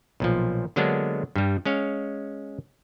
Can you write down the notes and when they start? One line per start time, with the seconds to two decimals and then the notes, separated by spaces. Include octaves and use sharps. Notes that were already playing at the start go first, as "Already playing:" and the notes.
0.20 B1 A#2 F3
0.76 D3 F#3 G#3 A#3 B3 D4
1.36 G2 G3
1.65 G#3 C#4 C#5 F5